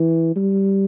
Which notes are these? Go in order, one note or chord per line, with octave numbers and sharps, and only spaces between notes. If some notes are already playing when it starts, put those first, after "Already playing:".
Already playing: E3
G3